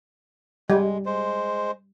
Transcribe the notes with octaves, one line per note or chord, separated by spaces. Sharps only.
G3 G#3
G#3 C5